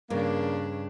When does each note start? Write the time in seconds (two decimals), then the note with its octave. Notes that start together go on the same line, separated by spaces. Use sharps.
0.10 G2 C#3 A#3 D4